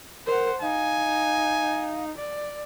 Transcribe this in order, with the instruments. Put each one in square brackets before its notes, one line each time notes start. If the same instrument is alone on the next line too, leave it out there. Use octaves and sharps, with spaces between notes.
[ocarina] A#4 [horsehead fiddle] C5 F#5
[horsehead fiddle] D#4 [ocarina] F5 [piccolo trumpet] G#5
[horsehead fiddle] D5